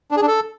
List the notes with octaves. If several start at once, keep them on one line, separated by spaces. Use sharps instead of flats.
D4
G#4
D4
A4